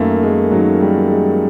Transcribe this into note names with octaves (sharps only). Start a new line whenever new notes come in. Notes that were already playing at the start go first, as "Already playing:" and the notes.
Already playing: F#2 D#3 A3 A#3
G#3
F#2 D#3 F#3
G3
G#3